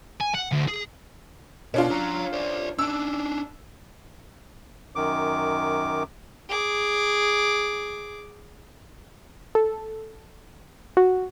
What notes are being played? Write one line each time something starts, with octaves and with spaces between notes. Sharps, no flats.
G#5
F#5
D2
G#4
B2 C#4 D4 F4
C#5 A#5
C5 D5
C#4 D4 E6
F#2 D#3 D6
G#4 D6
A4
F#4